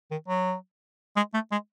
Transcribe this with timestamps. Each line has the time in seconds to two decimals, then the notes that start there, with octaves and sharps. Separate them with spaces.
0.11 D#3
0.29 F#3
1.17 G#3
1.34 A3
1.52 G#3